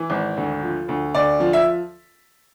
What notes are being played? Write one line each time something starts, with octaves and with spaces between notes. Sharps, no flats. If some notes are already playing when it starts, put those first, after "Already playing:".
Already playing: E3
G#1
D2
F3
D2
D2 D5
F3
E5